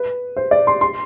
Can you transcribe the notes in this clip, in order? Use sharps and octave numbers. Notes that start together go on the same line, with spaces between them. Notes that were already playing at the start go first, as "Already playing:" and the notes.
Already playing: B4
C5
D5
C6
C6